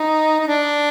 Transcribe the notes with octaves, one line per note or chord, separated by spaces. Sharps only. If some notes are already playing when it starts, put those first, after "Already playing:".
Already playing: D#4
D#4
D4